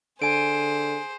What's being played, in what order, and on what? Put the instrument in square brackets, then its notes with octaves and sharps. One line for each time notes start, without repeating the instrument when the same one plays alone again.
[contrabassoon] D3 [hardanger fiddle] G#4 C5 [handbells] G#5 D7